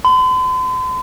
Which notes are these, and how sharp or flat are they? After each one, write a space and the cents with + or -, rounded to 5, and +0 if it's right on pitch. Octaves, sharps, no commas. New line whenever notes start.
C6 -45